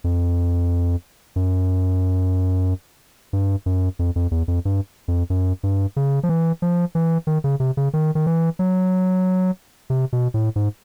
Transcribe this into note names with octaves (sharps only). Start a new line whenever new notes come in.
F2
F#2
G2
F#2
F2
F2
E2
F2
G2
F2
F#2
G2
C#3
F3
E3
F3
E3
D#3
C#3
C3
C#3
D#3
D#3
E3
F#3
C3
B2
A2
G#2